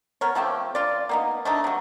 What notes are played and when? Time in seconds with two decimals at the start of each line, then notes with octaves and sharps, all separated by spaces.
0.21 B3 A#4 C#5
0.35 F3 A3 C4 G4
0.75 F4 D5
1.09 A#3 B3 D#4
1.45 A3 D4 D#4
1.64 C3 F#3